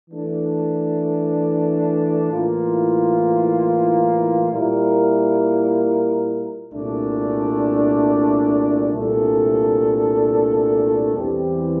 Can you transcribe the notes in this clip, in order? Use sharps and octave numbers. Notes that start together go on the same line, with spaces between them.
E3 A3 D4
A2 E3 A#3 F4
A#2 G3 A#3 E4 A#4
C2 A#2 A3 D4
C2 A#2 A3 D4 A4
E2 E3 G3 C4 G4